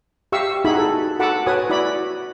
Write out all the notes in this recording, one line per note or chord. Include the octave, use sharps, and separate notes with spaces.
G4 E5 F5 C#6 E6
D#4 E4 F#4 G#4 E5 B5
A4
F#4 A4 F#5 A5 B5 D6
F#4 B4 C#5 G#5 D#6
E4 F#4 D5 B5